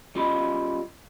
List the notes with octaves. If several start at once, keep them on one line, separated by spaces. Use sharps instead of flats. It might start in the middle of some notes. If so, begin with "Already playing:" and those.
G3 C#4 F4 D#5 B5